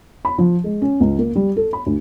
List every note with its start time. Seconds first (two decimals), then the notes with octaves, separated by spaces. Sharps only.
0.25 B5
0.38 F3
0.64 G#3
0.82 C#4
1.00 C#2
1.19 A#3
1.35 G3
1.56 A4
1.73 B5
1.86 D2